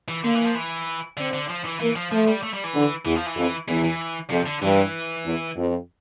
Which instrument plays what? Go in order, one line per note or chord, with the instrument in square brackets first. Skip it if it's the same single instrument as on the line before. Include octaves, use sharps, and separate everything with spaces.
[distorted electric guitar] E3
[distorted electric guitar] D3 [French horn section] A#3
[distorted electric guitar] E3
F3
E3
[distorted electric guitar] D3 [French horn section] C4
[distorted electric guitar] D3
F3
E3
[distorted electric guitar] E3 [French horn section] A#3
[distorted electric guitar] F3
[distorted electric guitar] F3 [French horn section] A3
[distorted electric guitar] G3
A3
G3
E3
[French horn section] D3
[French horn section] E2 [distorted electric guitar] E3
[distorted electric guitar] F3
E3
[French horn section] F2
[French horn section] E2 [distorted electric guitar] E3
[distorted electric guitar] E3
[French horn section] F2 [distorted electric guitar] C3
[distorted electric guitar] D3
[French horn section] G2 [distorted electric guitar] E3
[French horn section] E2
F2